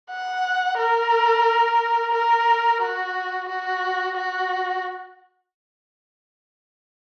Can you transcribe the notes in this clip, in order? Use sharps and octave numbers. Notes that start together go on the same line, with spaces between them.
F#5
A#4
A#4
F#4
F#4
F#4